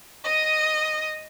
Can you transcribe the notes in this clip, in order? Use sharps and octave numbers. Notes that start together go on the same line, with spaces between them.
D#5 D#6